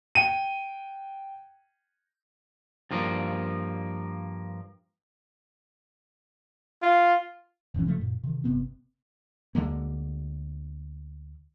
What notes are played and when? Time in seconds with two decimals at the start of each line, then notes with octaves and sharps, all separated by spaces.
0.15 G5 D#7
2.91 G2 F3 A#3
6.82 F4
7.74 D#1 F#2 E3 C#4
7.86 C#3 F3 A3
7.98 F#2 A#2
8.23 C3 D#3
8.44 G1 C3 B3 C4
9.55 D2 D3 G#3 A#3